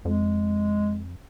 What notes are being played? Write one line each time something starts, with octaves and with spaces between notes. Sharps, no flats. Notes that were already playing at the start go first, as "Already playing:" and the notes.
F2 G#3